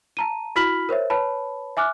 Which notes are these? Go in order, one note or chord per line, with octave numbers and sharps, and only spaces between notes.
A5 A#5 D#7
E4 F#4 B5 F6 B6 F#7
A#4 C5 C#5 E5
B4 C#5 A5 B5
E5 G#5 D6 F6 F#6